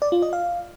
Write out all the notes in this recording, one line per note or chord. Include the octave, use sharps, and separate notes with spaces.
D5
F4
D#5
F5